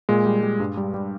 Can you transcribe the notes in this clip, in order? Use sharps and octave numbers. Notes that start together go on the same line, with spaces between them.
A#2 G#3
G3
G3
G2
G3
G3